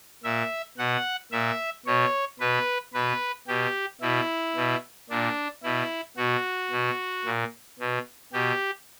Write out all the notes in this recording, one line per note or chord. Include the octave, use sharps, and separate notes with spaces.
A#2 E5
B2 F#5
A#2 E5
B2 C#5
B2 B4
B2 B4
B2 G4
B2 E4
B2
A#2 D4
B2 E4
B2 F#4
B2
A#2
B2
B2 G4